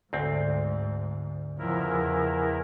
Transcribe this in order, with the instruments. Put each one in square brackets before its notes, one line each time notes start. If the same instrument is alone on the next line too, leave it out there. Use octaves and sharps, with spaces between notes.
[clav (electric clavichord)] D2 C4 [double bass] G#2
[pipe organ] E2 E4 A#4 [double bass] C#3 F3